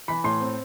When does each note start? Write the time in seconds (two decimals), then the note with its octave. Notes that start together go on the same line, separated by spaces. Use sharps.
0.08 E3 B5
0.24 A2 C6
0.41 C4